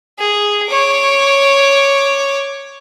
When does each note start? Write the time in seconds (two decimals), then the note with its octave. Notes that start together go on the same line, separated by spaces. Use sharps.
0.18 G#4
0.69 C#5 D6